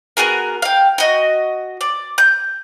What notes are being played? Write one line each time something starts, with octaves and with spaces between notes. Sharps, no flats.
B3 F#4 G#4 A#4
F5 G5
F#4 D#5
D5
G6